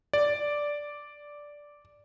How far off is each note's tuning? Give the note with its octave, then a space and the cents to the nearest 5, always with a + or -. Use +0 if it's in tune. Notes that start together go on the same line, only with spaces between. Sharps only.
D5 -5